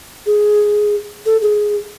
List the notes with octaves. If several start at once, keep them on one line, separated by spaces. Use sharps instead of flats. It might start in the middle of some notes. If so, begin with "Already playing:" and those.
G#4
A4
G#4